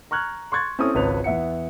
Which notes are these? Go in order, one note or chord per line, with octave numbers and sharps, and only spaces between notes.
A#5 C#6 F6 F#6 G#6
C6 C#6 F#6 G#6 A6
C4 C#4 E4 A4 D#6
G#1 C#2 B4 C#5 F7
E2 E5 F#5 C#7